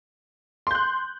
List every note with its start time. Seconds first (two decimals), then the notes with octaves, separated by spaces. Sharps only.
0.67 C6
0.71 G6
0.75 F#6